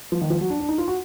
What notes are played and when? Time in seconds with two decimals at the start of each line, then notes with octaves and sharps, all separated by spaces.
0.12 F3
0.21 D#3
0.30 F3
0.41 F#3
0.50 D4
0.60 D4
0.69 D#4
0.78 F4
0.88 F#4